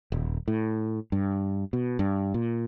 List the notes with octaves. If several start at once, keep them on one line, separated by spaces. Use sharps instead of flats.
D#1
A2
G2
B2
G2
A#2